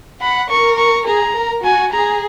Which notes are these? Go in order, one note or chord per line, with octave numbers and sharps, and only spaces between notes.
F#5 B5
A#4 C#6
C#6
G#4 A#5
A#4
F#4 G#5
G#4 A#5